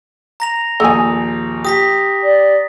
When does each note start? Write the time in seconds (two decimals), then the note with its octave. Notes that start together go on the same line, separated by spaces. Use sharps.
0.40 A#5 A#6 F7
0.80 A#1 D#2 A4 G#5 D#6
1.65 G4 D#6 A#6 B6
2.23 D5